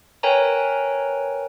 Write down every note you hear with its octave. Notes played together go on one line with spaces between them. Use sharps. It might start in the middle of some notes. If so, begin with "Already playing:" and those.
A#4 B4 C#5 G5 G#5 A#5